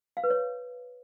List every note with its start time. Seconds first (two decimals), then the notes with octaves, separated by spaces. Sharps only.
0.17 F5
0.24 B4
0.30 C#5